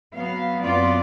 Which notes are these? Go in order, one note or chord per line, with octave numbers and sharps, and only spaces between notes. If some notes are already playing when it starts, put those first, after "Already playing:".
F#3 B3 F5
F#2 B3 C4 F4 D5